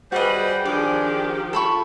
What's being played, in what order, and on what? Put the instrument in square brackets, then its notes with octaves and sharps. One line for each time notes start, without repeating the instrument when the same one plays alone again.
[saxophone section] G3 C5 [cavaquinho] F#4 D#5 [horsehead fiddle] G#4 B4
[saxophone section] D#3 F3 G4 [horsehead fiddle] D4 G#4 [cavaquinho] D5
[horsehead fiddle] F4 [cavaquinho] A4 B5 C#6